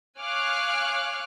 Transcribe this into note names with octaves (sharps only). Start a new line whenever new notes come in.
C#5 F5 G#5 D6 F6 F#6